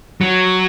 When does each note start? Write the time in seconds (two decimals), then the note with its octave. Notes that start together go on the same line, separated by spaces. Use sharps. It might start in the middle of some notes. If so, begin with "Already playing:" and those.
0.21 F#3